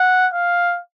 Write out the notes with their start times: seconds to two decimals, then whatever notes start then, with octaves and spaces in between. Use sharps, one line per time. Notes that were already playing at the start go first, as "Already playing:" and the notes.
Already playing: F#5
0.33 F5